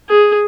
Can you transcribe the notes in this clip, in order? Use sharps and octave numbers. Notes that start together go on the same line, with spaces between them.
G#4